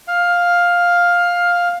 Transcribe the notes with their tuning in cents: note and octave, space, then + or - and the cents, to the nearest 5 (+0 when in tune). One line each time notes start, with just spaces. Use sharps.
F5 +10